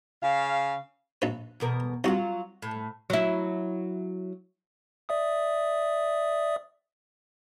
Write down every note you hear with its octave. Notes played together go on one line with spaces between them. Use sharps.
C#3 F5
A#1 B4
E2 B2 A#4
C2 F#3 F4 F#4
A2
F#3 E4
D5 E5 D#6